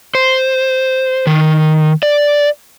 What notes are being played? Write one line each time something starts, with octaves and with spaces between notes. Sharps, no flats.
C5
D#3
D5